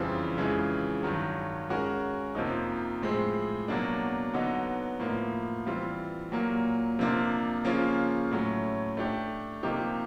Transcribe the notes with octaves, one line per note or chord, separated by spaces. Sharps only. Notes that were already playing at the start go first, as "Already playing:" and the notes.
Already playing: F2 C#3 E3 G3 C4
F2 C#3 E3 G#3
G2 D#3 F#3
G#3 C#4 F#4 A#4
F2 C3 F3 A#3 D#4
A2 F3 G#3 C4
B2 F#3 A#3 D4
D3 F#3 B3 D#4
A2 F3 A#3
E3 G3 C4 F4
A#2 F#3 A#3
C3 F3 A#3 D4 F4
C#3 F3 A#3 C#4 F4
A2 F#3 A3 C#4
A3 D4 G4
C3 F3 A#3 D#4 G4